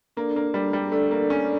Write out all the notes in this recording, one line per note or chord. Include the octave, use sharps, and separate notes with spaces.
A#3 D4 A4 D5
A#3
G3
G3
A3 D4 A4 D5
A#3
C#4